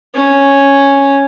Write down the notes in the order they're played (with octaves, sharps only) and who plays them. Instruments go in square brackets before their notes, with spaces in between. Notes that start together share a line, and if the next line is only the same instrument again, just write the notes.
[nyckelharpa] C#4